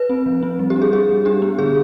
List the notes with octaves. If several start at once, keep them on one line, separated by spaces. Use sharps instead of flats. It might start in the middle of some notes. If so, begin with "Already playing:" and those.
Already playing: B4
C4
F3
C4
G3
G4
D4
G#4
G3 G#4
G3
D4 G4
B3
D3 G#4